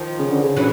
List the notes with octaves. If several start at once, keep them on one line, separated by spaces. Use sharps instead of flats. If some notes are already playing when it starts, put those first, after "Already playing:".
Already playing: D#3 F3
C#3
D3
C#3
E3 F#3